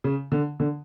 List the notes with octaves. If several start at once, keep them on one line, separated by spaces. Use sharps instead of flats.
C#3
D3
D3